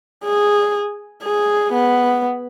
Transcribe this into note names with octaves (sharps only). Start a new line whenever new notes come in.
G#4
G#4
B3